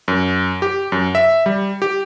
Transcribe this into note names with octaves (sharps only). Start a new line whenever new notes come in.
F#2
G4
F#2
E5
G3
G4